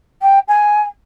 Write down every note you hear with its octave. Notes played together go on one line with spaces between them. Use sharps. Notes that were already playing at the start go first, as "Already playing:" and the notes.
G5
G#5